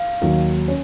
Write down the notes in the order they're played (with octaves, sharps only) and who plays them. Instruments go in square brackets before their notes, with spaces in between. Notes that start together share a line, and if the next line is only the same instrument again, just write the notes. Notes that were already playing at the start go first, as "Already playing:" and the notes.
Already playing: [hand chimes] F5
[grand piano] D#2 D#3 F#3
C#4